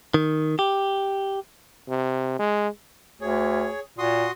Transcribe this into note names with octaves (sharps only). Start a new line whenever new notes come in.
D#3
G4
C3
G#3
D2 G#4 C#5
A#2 F#4 C6 D#6